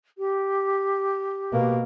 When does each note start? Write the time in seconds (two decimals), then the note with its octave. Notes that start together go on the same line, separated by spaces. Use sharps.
0.17 G4
1.52 B2 A#3